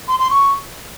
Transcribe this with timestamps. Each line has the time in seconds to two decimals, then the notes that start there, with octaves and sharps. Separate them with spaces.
0.08 C6
0.19 C6
0.30 C#6